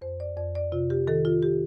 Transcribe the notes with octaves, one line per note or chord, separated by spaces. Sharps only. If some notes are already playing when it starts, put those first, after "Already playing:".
F2 C5
D5
F2 D5
D5
C3 F4
G4
D#3 A4
F4
G4